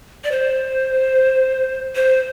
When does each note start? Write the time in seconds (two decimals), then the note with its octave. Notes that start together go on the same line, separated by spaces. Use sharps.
0.24 D5
0.32 C5
1.95 C5